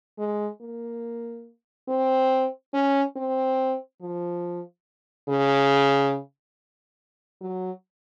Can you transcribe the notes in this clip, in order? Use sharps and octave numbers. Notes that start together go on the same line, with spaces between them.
G#3
A#3
C4
C#4
C4
F3
C#3
F#3